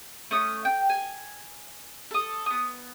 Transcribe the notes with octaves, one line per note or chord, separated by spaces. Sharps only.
A3 C#4 D#6
G5
G#5
A4 D#6
B3 D#6